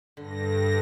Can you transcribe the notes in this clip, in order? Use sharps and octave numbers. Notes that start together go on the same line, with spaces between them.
G2 D3 A#6